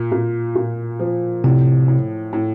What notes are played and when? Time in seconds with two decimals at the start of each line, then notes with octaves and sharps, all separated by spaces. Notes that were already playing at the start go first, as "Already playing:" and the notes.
Already playing: A#2
0.12 A#2
0.55 A#2
0.99 F3
1.44 A2 C3
1.88 A2
2.33 A2